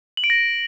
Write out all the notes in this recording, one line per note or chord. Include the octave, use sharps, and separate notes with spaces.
F#7
D7
A#6